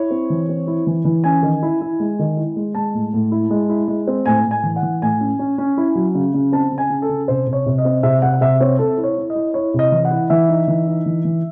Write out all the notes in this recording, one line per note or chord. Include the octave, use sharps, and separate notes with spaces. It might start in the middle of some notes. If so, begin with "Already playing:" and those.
Already playing: E4 C#5
C4
E3
C4
E4
E3
E3
C#4 G#5
D#3
E4
E4
G#3
D#3
E4
G#3
G#3 A5
A2
A2
E4
G#3
E4
G#3
C4
A2 G#5
A2
G#5
E3
F#5
E3
A2 G#5
C#4
C#4
C#4
E4
F#3
C#3
C#3
C4 A5
C#3
G#5
C#3
A4
C#3
C3 C5
C3
C#5
C3
D#5
C4
C3 E5
C3 F#5
F#5
C3 E5
C4 C#5
C4 A4
E4
C#5
E4
D#5
E4
E4 C#5
C3
D#5
E3
F#5
E4
E3 E5
D#4
E3
D#4
E3
E3